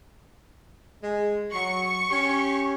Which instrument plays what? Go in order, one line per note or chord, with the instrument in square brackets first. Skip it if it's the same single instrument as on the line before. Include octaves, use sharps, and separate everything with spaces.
[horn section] G#3
[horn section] F#3 [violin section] C#6
[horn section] C#4 G4